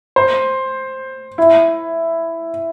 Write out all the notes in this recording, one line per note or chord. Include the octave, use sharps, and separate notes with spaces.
C5
E4